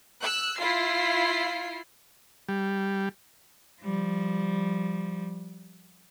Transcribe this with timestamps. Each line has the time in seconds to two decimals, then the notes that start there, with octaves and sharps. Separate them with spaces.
0.22 E6 F#6
0.59 E4 F4 C7
2.49 G3
3.81 F3 G3